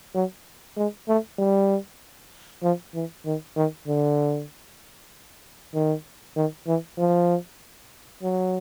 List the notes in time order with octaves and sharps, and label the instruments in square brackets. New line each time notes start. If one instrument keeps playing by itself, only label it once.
[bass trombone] F#3
G#3
A3
G3
F3
E3
D#3
D#3
D3
D#3
D#3
E3
F3
F#3